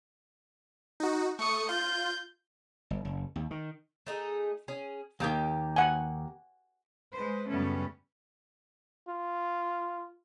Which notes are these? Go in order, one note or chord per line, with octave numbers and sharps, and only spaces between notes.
D#4 F#4
A3 C#6 D#6 C#7
F4 G6
G1
F#1
D#2
D#3
A3 D#4 G#4
C#4 G#4
D#2 D#3 A#3 G4 G5
F#5 G#5
G#3 B4 C5
F#2 C#3 G3 A3 B3 C#4
F4